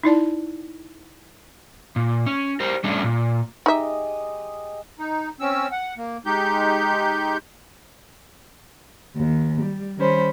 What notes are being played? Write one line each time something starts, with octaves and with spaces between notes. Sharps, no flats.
D#4 E4 D5 A5
A#2
C#4
G4 A#4 C5
G3 A3 C#4 D4
A#2
G#3 D#4 G4 D#5 E5
D#4
C4 C#4 E6
F#5
A#3
G#3 D#4 G4 G6
D#2
G3
D#3 G3 C#4 C5 B5